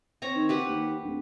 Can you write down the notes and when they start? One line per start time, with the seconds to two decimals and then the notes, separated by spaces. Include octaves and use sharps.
0.22 C4 C#5 A#5
0.36 D#3
0.49 G4 B4 F#5
0.68 D#2
1.03 D1